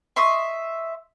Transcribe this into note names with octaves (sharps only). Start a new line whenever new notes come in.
D#5 E5 C6 C#6